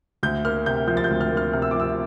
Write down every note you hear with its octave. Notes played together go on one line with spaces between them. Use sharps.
D2 G6
A#3 F6
C3 G6
F3 G6
A6
G6
D2
F6
A#3
F6
C3 F6
E6
F3 D6
E6